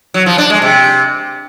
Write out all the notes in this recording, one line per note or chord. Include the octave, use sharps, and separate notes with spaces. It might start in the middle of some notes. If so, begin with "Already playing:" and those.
F#3
F3
D4
G#3
C3